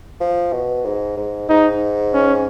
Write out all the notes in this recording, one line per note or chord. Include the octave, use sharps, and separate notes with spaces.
F3
B2
G#2
G#2
G#2 D#4
C#4